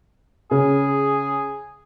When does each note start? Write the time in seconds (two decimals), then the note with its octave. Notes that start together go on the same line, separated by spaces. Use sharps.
0.51 C#3 G#4